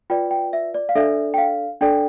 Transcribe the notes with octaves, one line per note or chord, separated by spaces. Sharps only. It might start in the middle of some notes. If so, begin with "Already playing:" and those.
F4 B4 D5 G5
G5
E5
D5
F5
D4 A4 D5 E5
G5
F5
D4 A4 D5 G5